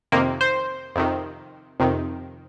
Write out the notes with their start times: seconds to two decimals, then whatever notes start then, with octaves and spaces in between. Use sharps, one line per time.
0.12 F2 C3 D#3 A#3
0.41 C5
0.96 F2 C3 D#3
1.80 F2 C3 D#3